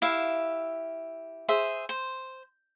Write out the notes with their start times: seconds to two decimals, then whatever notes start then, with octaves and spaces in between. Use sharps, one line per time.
0.02 E4 G4 E5 F5
1.49 G#4 C5 E5
1.89 C5